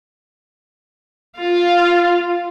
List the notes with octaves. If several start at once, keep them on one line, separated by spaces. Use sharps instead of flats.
F4 F5